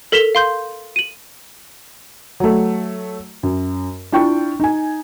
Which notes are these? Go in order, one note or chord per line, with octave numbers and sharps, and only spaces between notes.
A4 A#4 B6 E7 F7 G7
F5 C6 G6
D#7 F#7
F#3 A3
F#2
D4 E4 F4 G5 C#6
D#4 G#5